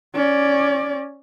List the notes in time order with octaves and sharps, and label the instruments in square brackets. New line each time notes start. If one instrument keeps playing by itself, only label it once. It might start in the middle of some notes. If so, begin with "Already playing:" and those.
[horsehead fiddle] C#4 D5